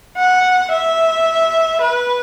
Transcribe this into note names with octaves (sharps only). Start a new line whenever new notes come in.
F#5
E5
B4